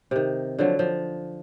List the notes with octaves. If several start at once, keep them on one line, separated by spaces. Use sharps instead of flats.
C3 D#3
D3 F3 F#3
F3